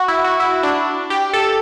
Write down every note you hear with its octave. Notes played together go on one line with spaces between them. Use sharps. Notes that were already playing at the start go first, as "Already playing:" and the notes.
Already playing: F#4
E4
F#4
E4
D4
G4
A4